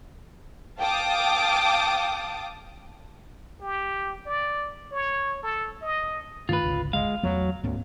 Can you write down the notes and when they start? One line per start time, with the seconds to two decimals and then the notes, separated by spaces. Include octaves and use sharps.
0.79 F5 G5 A5 D6 D#6
3.61 G4
4.26 D5
4.92 C#5
5.43 A4
5.82 D#5
6.49 G2 D#3 A3 F4 B4
6.62 G#1 D2 C#3
6.93 G#3 F5
7.23 E2 F#3 A3 B3
7.64 D2 G#2 B3 C#4